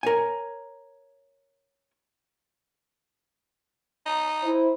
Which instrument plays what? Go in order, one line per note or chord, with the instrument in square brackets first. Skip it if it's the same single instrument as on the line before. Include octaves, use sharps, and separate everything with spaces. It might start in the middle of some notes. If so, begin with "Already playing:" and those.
[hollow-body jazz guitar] A#4 C#5 G#5
[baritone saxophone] D#4
[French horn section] E4 C5